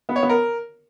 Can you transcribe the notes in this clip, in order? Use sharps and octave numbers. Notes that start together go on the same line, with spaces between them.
B3
C#5
B3
A#4